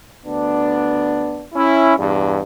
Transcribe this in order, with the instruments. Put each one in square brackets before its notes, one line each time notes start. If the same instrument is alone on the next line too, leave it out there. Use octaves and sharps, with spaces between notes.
[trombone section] D2 B3 D4
C#4 E4
E2 G2